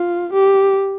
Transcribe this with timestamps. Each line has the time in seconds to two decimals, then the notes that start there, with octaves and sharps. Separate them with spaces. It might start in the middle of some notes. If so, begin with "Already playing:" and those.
Already playing: F4
0.33 G4